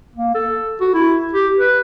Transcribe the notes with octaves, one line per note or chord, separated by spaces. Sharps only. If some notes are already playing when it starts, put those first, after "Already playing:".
A#3
A4
F#4
E4
G4
B4